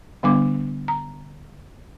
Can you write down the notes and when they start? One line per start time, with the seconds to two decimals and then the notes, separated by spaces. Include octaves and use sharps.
0.23 D3 G3 B3 D4 D6
0.88 A#5